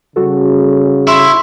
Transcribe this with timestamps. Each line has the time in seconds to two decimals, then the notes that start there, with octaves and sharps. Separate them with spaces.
0.16 C#3 G3 F#4 A4
1.07 E4 C6 C#6